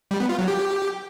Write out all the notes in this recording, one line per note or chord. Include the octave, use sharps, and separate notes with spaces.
G3
B3
F4
F#3
G4